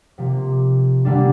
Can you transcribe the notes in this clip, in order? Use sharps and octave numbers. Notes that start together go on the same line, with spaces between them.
C3 F3 A#3
D3 G3 A#3 D4